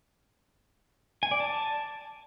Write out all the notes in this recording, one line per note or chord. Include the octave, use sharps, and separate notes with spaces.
G#5
D5
A5